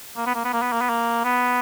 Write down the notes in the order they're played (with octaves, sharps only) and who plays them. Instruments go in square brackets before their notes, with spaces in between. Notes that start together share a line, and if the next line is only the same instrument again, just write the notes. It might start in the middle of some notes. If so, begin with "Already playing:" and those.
[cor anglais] A#3
B3
A#3
B3
A#3
B3
A#3
B3
A#3
B3